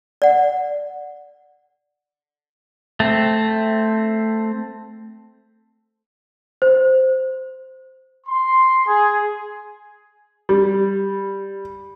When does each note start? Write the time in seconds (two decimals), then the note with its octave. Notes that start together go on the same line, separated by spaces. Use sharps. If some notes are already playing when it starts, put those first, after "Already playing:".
0.22 D5 F#5
3.00 A3 C4
6.62 C5
8.27 C6
8.87 G#4
10.49 G3